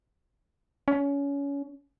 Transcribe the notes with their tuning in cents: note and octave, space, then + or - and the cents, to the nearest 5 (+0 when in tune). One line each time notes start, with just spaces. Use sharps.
C#4 +25